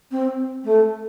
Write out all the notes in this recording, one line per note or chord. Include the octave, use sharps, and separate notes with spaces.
C4
A3